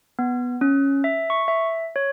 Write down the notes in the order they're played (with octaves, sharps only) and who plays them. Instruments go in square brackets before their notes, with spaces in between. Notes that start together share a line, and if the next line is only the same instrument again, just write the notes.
[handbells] B3
C#4
E5
C#6
E5
C#5